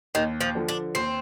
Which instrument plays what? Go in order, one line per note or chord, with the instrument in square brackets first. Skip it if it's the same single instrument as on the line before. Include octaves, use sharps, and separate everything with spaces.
[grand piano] D#2 [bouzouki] D#3
[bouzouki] F3
[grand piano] D3 F3
[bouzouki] D4
[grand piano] D#2 [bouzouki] C4